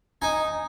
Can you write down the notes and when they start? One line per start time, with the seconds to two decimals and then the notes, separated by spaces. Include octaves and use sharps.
0.22 D#4 G#5